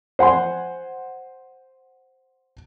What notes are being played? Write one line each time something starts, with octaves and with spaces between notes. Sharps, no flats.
C5 F#5 G#5 C6